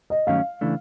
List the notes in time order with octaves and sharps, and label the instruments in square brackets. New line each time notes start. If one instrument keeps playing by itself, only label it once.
[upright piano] D#5
[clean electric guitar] G2 D#3 F#3 A3 C#4 [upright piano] F5
[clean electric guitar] C#3 E3 A3 D4